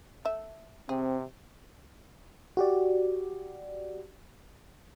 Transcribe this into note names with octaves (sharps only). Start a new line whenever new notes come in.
A3 E5
C3 C4 G#4
F#4 G4 D5